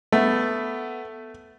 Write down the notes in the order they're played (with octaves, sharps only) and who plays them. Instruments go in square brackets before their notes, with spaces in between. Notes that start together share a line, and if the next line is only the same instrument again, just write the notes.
[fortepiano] A3 [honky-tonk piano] B3